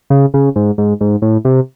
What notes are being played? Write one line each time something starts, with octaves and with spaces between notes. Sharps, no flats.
C#3
C#3
G#2
G#2
G#2
A2
C3